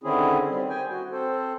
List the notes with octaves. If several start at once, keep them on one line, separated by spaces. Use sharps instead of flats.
D3 D#3 C4 C#4 E4 G#4
G3 C4
G5 G#5
F#4
C4 A4 C5